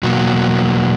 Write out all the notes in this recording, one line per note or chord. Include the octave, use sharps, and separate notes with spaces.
E2 B2 F#3 A#3 F#4